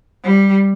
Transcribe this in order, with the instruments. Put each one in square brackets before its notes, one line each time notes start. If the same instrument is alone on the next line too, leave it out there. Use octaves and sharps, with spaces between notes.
[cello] G3